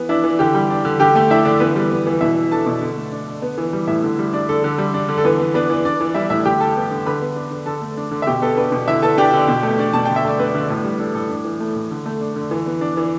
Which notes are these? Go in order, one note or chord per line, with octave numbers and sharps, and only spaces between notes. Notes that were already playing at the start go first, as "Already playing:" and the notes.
Already playing: E3 B3
D4 E4 E5
E3
D3 G4 G5
G3
D4
D3
D3 G4 G5
A3
D4 E4 E5
D3 D4 D5
E3 B3 B4
G3
B3
E3
B2 E4 E5
B3
D4 A4 A5
B2
D3
A3
D4
D3
B3
E3
G3
A2 E4 E5
D3
G3
D4 D5
D3 A4
D3 A4
G3
D4
D3
A4
E3 B3 B4
B3
B3 D4 B4
E3
D4 D5
E3
G3 E4 E5
A2 E4 E5
D3 G4 G5
G3 A4 A5
B3
D3
D3 B4 B5
B3
D4
D3
D3 A4 A5
A3
D4
D3
E5
B2 G4 G5
B3 A4
B3 D4 B4
B2
D3 E4 E5
B3 A4 A5
D4 G4 G5
D3
B2
A3
D4 D5
B2 A5
D3 G5
E5
A3 D5
B3 D4 B4
D3
A2
G3
D4 A4
A2 A4
D4
E3
A3
A2
D3
A3
D4
D3
E3
B3
D4
E3